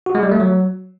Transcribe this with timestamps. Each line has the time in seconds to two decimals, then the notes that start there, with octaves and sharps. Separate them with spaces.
0.06 F#4
0.15 G#3
0.23 G3
0.32 A3
0.40 F#3